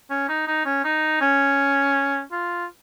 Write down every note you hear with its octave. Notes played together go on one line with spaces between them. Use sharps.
C#4
D#4
D#4
C#4
D#4
C#4
F4